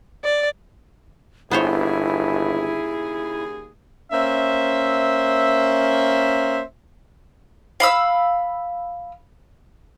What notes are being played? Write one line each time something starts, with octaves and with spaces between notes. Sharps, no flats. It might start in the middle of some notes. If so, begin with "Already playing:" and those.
D5
G1 D#2 C#3 B3 E4 G#4 C5 C#5
A#3 C#4 C5 E5
F5 B5 E6